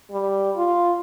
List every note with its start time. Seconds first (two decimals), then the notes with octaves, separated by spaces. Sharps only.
0.11 G3
0.56 F4